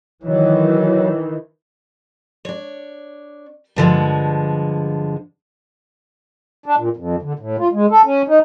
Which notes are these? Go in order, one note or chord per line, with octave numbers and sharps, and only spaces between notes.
D#3 E3 F#3
D4 C#5
G2 D3 F3 G#3
D4
A#2
F2
D3
A2
F4
G#3
A4
C#4
D#4